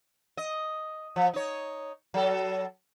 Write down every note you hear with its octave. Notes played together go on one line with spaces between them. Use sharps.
D#5
F3
D#4 C#5
F#3 A4